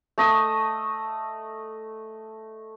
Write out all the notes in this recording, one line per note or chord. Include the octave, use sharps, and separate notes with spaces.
A3 D#5 D#6 E6